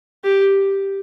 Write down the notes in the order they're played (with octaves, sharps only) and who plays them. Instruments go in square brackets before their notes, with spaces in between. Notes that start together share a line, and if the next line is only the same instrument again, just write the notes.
[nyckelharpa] G4